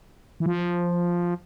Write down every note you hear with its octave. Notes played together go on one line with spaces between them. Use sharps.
E3
F3